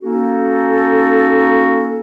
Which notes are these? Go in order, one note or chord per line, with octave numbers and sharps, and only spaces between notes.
A#3 C#4 D#4 F#4 A4